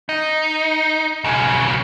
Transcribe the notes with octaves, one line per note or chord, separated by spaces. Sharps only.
D#4
B1 C#3